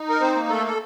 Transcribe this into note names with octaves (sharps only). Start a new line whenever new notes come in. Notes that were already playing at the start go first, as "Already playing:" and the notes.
Already playing: D#4
A#4
C4 C5
A#3
A3 A4
A4